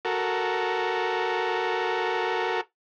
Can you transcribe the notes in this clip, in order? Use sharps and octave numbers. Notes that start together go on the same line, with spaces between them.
F#4 A4 A#4